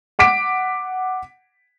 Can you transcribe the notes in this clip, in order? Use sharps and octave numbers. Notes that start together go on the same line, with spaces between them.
F#5 D6 B6 D7